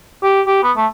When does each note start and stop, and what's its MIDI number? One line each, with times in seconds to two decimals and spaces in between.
0.23 0.41 67
0.46 0.59 67
0.63 0.71 59
0.77 0.86 57